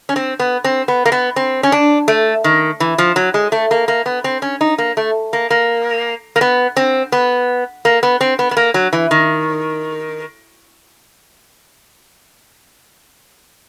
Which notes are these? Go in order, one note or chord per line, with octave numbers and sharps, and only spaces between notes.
C#4
C4
B3
C4
B3
A#3
B3
C4
C#4
D4
A3
D#3
E3
F3
F#3
G#3
A3
A#3
A#3
B3
C4
C#4
D#4
A#3
A3
A#3
A#3
A#3
B3
C4
B3
A#3
B3
C4
B3
B3
A#3
F#3
E3
D#3